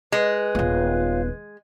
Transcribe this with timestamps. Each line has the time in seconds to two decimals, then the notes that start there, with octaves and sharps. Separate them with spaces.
0.12 G#3 B4
0.55 D#1 B3 F4 C#5 F5